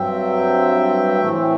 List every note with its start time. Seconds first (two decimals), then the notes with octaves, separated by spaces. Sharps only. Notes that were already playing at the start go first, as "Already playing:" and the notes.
Already playing: G2 F#3 C4 E5 G5
1.20 A2 E3 A3 C4